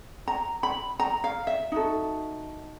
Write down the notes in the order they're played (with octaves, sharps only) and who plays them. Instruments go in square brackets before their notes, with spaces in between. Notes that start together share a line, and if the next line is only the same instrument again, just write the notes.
[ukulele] A#5
B5
A#5
F5
E5
D#4 F#4 A4